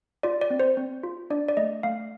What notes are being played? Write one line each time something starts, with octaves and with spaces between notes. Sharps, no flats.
F4 D5
D5
C4
C5
C4
F4
D4 D5
D5
A3 D#5
A3 F5